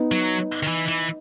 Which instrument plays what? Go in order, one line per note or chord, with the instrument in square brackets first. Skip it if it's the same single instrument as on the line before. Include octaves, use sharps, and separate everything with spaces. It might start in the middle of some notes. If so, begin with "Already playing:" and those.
Already playing: [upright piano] B3 D#4
[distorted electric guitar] F#3
D#3
E3
E3